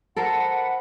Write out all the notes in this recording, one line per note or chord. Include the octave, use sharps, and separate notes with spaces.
A4 A#4 C5 F#5 B5